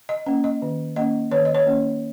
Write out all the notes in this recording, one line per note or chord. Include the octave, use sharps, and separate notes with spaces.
D#5
A#3 C#4
D#5
D#3
A#3 C#4 D#5
D#3 C#5
D#5
C#5
A#3 C#4